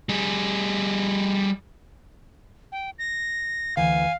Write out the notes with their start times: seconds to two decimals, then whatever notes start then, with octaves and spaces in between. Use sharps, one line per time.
0.09 G3 G#4
2.72 G5
2.99 A#6
3.77 D2 E3 F5 G#5